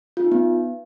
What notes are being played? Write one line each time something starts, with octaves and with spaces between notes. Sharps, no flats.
F4
D#4
B3